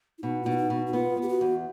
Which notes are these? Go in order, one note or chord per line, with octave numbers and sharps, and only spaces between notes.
E4
B2 D#4
F4
B2 E4
D#4
B2
F#4
B3 F4
B3
G4
F#4
E2